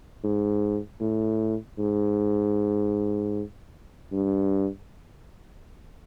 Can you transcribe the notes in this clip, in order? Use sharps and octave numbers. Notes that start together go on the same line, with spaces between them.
G#2
A2
G#2
G2